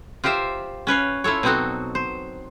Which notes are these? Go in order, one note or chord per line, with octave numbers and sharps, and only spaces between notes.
F4 G4 A#4 C5 E5
C#4 B4 C#5 F5
E4 F4 A4 C#5
B2 F#3 C4 D#4 F#4 A4
C5